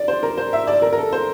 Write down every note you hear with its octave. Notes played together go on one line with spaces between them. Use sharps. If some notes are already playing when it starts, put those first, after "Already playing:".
Already playing: D5
C5
A#4
C5
E5
D5
A#4
A#4
A4
C5